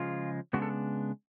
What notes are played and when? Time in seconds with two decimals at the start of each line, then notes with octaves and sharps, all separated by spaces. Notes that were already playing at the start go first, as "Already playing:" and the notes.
Already playing: C#3 F3 G#3 F4
0.53 C#3 G#3 B3 D4 F#4
0.62 A4